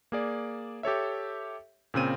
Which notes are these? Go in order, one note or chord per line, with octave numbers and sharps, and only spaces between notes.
A#3 G#4 D5
G4 A4 C#5 E5
A#2 C#3 C4 D#7